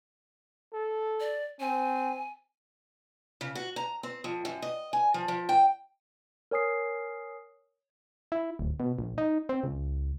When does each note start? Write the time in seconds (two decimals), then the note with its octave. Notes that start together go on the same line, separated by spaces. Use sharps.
0.73 A4
1.20 D5
1.60 C4 G#5
3.41 C#3
3.55 F#4
3.76 A#5
4.03 C4
4.24 F2
4.45 F#2
4.62 D#5
4.93 G#5
5.14 F3
5.28 F3
5.49 G5
6.51 A#4 C#5 G#5 D#6 C7
8.32 E4
8.59 D1
8.80 B2
8.99 A#1
9.18 D#4
9.49 C4
9.64 C#2